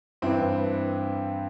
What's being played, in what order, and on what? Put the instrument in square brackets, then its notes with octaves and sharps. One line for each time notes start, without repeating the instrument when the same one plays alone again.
[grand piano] G2 E3 C4 E4